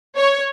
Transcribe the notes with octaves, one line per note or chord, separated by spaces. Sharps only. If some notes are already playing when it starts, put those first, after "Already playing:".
C#5